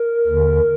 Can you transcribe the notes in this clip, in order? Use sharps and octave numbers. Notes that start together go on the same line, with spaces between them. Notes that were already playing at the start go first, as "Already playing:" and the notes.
Already playing: A#4
D#2 D3